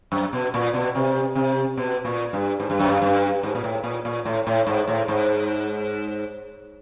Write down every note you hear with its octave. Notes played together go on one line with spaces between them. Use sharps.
F#2
B2
A#2
B2
C3
C3
B2
A#2
G2
G#2
G2
F#2
G2
G2
G#2
A#2
A2
A#2
A#2
A2
A2
G#2
A2
G#2